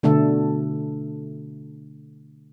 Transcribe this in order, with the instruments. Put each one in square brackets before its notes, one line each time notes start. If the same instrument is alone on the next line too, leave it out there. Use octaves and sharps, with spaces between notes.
[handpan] B2 D3 A3 A4